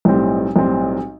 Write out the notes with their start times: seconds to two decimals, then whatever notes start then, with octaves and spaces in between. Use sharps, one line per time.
0.05 B1 A2 G3 C4
0.56 B1 A2 G3 C4